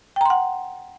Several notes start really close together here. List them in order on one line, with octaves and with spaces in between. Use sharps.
G5 A#5 C6 F#5